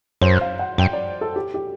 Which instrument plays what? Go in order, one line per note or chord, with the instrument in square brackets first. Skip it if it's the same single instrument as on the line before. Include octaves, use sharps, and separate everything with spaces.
[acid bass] F#2 [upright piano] C5
[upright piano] F5
F#5
[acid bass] F#2 [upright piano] G5
[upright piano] D5
A4
G4
G4